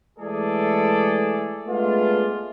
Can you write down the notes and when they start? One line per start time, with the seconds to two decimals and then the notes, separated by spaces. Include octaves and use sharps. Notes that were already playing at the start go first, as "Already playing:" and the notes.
0.19 E3 G#3 A3 G#4 A4 D5
1.66 G#3 A3 B3 D4 F4